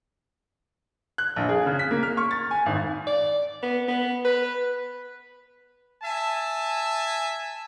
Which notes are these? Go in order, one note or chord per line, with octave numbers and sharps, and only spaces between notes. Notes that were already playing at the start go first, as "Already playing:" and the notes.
F#6
A#1
G#4
C#3
B6
A#3
F6
C#6
A6
G#5
G#1
D5
B3
B3
B4
E5 G#5 A5